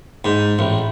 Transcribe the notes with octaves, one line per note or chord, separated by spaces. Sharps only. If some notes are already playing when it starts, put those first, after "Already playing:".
G#2
A1